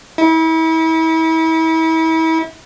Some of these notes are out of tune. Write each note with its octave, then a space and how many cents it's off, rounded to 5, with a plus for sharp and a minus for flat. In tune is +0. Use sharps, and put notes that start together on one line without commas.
E4 -35